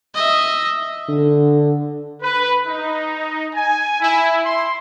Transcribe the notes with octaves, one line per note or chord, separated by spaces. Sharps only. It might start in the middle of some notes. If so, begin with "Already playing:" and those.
D#5 E5
D3
B4
D#4
G#5
E4
C6